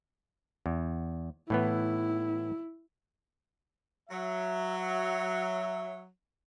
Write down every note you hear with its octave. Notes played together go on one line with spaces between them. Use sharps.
E2
A2 E3 B3 E4
F#3 E5